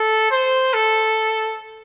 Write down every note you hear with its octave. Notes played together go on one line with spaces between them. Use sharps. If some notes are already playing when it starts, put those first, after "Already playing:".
Already playing: A4
C5
A4